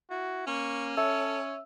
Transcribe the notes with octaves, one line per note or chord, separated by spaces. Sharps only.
E4 F#4
A#3 C#4 C#6
A4 C#5 E5 E6